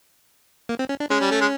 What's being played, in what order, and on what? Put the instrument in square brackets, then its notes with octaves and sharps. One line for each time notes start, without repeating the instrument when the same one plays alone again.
[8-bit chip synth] A#3
C4
C#4
D4
[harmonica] G#3 [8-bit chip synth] C#4
[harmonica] G3
A3
G#3